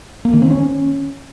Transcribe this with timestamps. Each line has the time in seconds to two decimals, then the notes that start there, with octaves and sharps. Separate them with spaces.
0.25 A#3
0.33 D#3
0.42 C4
0.50 C#4